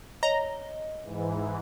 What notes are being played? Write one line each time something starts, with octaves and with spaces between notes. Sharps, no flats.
C#5 D#5 A#5
G#2 E3